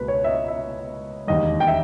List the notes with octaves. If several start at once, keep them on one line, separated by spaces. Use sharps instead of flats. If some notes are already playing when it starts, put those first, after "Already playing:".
Already playing: C#2 B2 A#3 B4
C#5
E5
D#5
E5
E1 D#2 D#3 G3 D#5
G5
E5